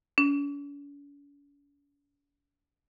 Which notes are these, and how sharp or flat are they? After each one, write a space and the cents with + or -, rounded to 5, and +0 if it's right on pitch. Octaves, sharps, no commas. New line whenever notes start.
C#4 +45